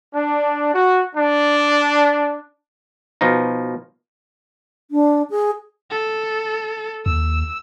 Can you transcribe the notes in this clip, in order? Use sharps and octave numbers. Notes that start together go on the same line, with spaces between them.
D4
F#4
D4
B2 F3 D#4
D4
G#4
A4
D#2 E6